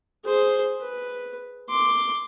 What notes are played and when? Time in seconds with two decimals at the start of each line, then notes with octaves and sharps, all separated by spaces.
0.25 G#4 C5
0.81 B4
1.69 C6 D6